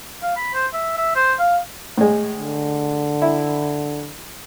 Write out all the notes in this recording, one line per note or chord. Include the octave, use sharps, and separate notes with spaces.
F5
B5
C5
E5
E5
C5
F5
A2 G#3
D3
E4